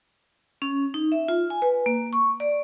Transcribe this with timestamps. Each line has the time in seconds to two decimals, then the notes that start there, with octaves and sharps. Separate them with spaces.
0.62 C#4
0.94 D#4
1.12 E5
1.28 F4
1.50 G#5
1.62 B4
1.86 A#3
2.13 C#6
2.40 D5